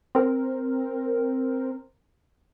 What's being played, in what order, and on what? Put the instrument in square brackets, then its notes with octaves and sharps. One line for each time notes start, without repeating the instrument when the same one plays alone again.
[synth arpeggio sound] C4 A#4